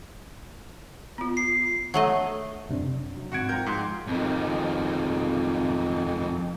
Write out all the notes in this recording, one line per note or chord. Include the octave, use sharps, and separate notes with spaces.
B3 F4
C7
F#3 A3 D#5
F#2 C3 D4
F#3
G#1 F#4 F#5 G#6 C#7 D7
F3 A#4 G5 A#5 G6
G#2 G5 C6 G6
F2 D#3